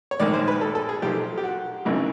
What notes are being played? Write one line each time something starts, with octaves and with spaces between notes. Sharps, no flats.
C#5
A#1 G#2 D#3 D5
C5
B4
A4
A4
G#4
B1 A#2 F3 G4
G4
F#4
G#1 F#2 C#3 E3